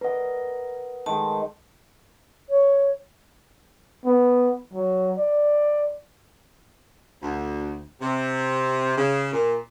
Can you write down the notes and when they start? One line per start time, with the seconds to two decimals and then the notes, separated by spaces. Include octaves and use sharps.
0.01 A#4 B4 D#5 F#5
1.06 D#3 G#3 A5
2.49 C#5
4.05 B3
4.74 F#3
5.18 D5
7.22 D2
8.01 C3
8.97 C#3
9.32 A#2